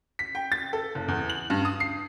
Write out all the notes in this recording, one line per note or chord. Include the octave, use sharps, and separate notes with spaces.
B6
G5
A6
A4
F#1
E2
F#7
G2
D#6
C7